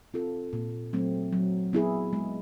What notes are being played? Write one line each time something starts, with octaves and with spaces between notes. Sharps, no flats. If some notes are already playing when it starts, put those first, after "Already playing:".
C4 F4 A4
A#2
F#3 A3 C4
F#3
B3 E4 G#4
G#3